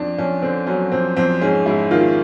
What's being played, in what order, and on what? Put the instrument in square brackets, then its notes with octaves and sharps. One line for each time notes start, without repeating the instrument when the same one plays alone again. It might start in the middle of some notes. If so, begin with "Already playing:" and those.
Already playing: [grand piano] F2 D4
F2 C#4
D3 C4
F#3 C#4
F2 C4
F2 C4
G#2 C#4
G#2 E4
D#3 F4